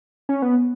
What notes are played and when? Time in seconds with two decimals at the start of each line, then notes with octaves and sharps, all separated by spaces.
0.29 C#4
0.42 B3